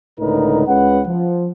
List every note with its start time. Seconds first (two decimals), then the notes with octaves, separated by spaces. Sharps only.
0.19 C#2 A2 D3 D#4 A#4 B4
0.67 C#2 C#3 B4 F#5
1.07 F3